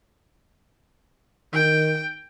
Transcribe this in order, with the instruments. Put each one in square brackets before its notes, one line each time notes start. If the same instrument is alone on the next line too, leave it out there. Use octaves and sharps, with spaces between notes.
[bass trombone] D#3 [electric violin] G5